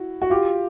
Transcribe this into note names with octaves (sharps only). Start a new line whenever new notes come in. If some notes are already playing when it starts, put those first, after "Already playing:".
Already playing: E4 F#4
F#4
F4 G4